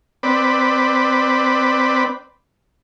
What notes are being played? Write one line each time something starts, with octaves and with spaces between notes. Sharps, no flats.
C4 B4 D5